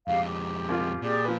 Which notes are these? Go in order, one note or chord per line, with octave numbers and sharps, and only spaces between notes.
F2 G#3 G4 F5
G4
C2 F4
A#2 G4 G#4 D5
F3 B4